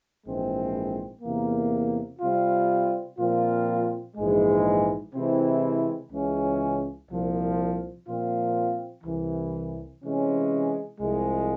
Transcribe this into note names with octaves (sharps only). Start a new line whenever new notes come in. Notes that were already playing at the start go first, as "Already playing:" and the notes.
A#1 G#2 E3 G#3 C4
E2 C3 E3 A#3
C3 G3 C4 F4
A#2 F3 C4 F4
A#1 G#2 E3 G#3
C3 E3 G#3 C4 E4
C#2 C#3 E3 G#3 C#4
C2 A#2 F3
A#2 F3 C4 F4
C2 C3 E3
C3 E3 G#3 C#4
C2 C3 F3 G#3